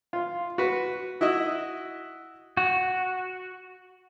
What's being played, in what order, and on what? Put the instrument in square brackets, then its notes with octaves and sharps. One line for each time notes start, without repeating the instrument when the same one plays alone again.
[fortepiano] F4
F#4 B4
E4 F#4 D#5 E5
[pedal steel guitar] F#4